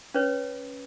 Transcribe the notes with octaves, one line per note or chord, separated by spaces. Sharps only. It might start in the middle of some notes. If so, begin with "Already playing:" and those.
C#4 B4 C#5